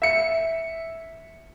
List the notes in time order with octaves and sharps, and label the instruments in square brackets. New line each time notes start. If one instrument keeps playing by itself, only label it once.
[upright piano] E5 C#7